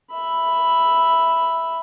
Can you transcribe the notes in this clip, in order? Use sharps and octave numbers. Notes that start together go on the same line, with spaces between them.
E5 B5